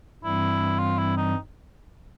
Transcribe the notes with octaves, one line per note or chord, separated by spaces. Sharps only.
G2 E3 G3 C4 E4
F4
E4
D#4